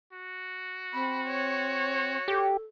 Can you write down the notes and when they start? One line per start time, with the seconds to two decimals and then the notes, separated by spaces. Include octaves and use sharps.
0.13 F#4
0.93 C4 B5
1.29 C#5
2.28 G4 A4